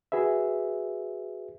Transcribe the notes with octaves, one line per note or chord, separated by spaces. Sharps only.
F#4 G#4 B4 E5